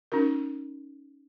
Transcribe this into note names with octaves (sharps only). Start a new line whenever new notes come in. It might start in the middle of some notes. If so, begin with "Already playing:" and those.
C#4 D#4 F#4 A#4